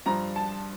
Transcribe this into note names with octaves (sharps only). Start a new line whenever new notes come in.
G2 F3 A#5
A5